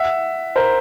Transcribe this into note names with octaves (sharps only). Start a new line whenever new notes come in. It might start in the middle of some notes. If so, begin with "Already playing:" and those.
Already playing: E5 F#5
A#4 C5